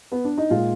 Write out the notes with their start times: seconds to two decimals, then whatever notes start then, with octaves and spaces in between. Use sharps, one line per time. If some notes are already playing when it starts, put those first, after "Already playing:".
0.12 B3
0.25 D4
0.37 D#4
0.50 A#2 G#3 F4